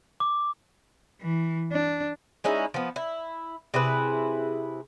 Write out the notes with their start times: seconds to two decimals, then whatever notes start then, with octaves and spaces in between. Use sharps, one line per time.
0.20 D6
1.22 E3
1.72 D4
2.44 G#3 C#4 D#4 E4
2.74 F3 B3
2.96 E4
3.74 C3 E4 G#4 B4